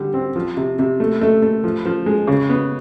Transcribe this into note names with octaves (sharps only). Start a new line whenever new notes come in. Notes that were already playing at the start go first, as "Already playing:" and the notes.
Already playing: D3 G3
C4
F3
C3
C3
A3
A3
A3
F3
F3
G#3
C#3
B3